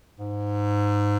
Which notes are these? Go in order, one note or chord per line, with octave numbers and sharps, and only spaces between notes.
G#2